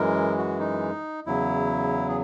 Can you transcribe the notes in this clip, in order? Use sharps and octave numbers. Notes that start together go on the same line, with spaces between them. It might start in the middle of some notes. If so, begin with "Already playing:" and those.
Already playing: F#2 E3 G#3 A#4
F#4
D#4
E2 C#3 F#3 E4
G#4